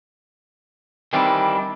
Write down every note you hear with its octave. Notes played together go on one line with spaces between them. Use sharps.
D#3 E3 G3 C4 D4